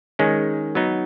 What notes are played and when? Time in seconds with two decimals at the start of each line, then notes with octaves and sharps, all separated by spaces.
0.19 D#3 G#3 C#4
0.75 F#3 B3 D#4